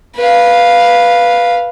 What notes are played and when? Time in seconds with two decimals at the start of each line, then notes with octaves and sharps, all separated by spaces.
0.16 B4 F5